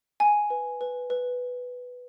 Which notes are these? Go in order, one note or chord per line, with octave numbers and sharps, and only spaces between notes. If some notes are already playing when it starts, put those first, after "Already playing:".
F#5 G#5
B4
B4
B4